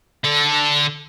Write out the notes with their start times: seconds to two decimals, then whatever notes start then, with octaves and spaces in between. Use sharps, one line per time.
0.24 D3 A4